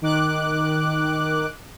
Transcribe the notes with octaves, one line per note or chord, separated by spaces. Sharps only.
D#3 D6 F#6